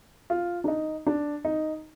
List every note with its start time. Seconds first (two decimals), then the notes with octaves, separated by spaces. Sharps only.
0.30 F4
0.64 D4
0.68 D#4
1.07 D4
1.45 D#4